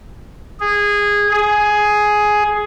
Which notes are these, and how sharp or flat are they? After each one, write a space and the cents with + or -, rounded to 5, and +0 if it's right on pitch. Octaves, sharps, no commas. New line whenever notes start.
G#4 -15
G#4 +10